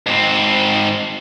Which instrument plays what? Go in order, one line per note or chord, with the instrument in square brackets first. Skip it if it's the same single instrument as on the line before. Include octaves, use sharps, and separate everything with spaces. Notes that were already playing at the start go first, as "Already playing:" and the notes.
[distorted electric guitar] G#2 C4